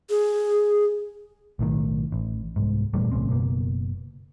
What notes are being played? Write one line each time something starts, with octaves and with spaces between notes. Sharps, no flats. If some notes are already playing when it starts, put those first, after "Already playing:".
G#4
B1 A2 D#3
A1
C2 G#2
E2 A#2 G3 A3
B1 A2 C#3 C4
F#1 B2 A#3